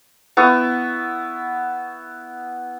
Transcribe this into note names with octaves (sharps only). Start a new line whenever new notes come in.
B3 E4 C#6